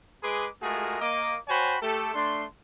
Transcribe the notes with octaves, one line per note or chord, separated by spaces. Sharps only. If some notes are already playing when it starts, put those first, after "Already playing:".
G#3 G#4 B4 C6 D6
G#3 A3 F4 F#4 G#4 A#4
A#3 D#5 D6
F#4 C5 C#5 G5 G#5 B5
A3 G4 A4
A3 D4 C6